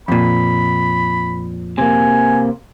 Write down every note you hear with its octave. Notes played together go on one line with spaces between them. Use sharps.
F2 A#2 B5
C3 A#3 G#5